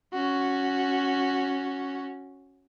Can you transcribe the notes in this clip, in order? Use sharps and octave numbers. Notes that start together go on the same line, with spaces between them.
C#4 F#4